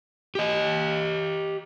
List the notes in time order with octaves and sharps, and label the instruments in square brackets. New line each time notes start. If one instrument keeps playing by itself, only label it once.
[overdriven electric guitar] G4 D#5